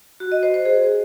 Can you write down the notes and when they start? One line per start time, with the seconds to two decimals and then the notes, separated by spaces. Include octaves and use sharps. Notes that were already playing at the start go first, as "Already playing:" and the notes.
0.20 F#4
0.32 D#5
0.43 C5
0.54 C5
0.65 G#4